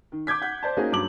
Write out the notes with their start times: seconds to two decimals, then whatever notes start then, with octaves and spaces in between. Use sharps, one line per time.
0.12 D#3
0.27 D6 G6 G#6 B6
0.42 F#5 G6
0.63 C5 D5 A5
0.77 A#3 C#4 D#4 F#4 G#4
0.92 G2 F#3 D6 F#7